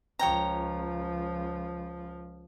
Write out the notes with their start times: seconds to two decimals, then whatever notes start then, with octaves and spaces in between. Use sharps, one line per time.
0.19 C#2 F3 C#5 G5 A#5